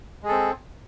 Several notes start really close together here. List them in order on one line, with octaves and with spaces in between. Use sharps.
G#3 G#4 A4 C4